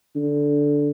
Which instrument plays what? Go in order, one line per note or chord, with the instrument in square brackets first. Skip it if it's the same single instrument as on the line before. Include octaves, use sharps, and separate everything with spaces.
[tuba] D3